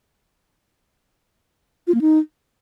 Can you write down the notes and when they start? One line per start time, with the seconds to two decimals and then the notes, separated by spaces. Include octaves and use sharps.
1.87 F4
1.94 A#3
2.01 D#4